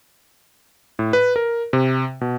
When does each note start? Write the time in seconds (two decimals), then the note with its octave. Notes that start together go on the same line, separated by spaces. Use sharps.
0.99 A2
1.13 B4
1.36 A#4
1.73 C3
2.21 B2